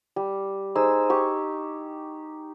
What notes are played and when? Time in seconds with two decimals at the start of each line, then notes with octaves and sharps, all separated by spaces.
0.16 G3
0.75 D#4 G#4 C5 E6
1.10 G4 C#6